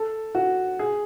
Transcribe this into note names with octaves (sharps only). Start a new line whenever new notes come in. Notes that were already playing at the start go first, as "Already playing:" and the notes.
Already playing: A4
F#4
G#4